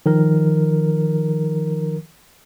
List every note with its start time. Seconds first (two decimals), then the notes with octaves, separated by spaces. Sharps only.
0.06 D#3 F3 A#4